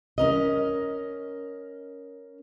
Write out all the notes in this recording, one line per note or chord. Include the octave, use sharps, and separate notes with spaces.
C#4 A#4 D#5